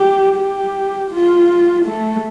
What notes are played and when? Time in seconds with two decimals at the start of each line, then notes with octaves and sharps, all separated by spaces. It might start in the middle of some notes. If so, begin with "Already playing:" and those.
Already playing: G4
0.36 G4
1.11 F4
1.86 A3